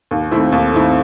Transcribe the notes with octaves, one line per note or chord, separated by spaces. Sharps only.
D#2
D#3 A3 C4 E4
D#2
D#3 A3 C4 E4